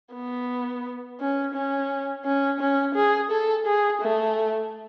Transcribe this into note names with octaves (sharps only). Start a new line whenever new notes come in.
B3
C#4
C#4
C#4
C#4
G#4
A4
G#4
A3